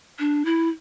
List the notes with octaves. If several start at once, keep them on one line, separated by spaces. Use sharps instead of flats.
D4
E4